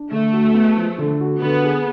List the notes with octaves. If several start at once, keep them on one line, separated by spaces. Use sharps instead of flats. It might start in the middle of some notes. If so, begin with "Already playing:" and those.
Already playing: D4
D3 A3
F#4
B3
F3
D3
F#4
D3 B3
G#4